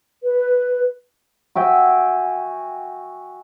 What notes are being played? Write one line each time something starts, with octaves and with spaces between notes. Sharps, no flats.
B4
F#4 E5 G5 G#5